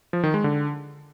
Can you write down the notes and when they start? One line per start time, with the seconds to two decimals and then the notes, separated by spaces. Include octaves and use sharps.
0.13 F3
0.23 D#3
0.34 G#3
0.44 D3